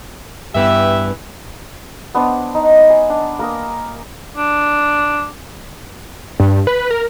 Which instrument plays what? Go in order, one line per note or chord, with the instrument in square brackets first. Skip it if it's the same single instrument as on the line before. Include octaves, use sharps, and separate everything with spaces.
[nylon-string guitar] G2 B3 [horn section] E3 G4 E5
[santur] B3 D4 C5
D#4
G#5
D4
A#3 A#4 D#6
[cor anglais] D4
[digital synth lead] G2
B4
A#4